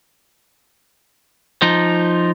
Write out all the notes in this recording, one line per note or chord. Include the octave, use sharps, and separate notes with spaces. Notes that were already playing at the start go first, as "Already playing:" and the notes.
F3 D#4